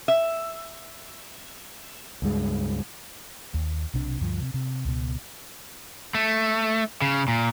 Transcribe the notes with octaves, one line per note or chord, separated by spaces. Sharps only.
E5
C#2 G2 G#3
D#2
B1 C3 D4
D2 G2 F3
C3
C3
C#2 B2
A3
C#3
A#2